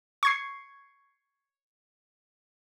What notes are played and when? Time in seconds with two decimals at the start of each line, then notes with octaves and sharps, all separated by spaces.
0.23 C#6 G#6 C7